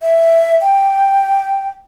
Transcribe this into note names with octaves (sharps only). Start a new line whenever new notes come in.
E5
G5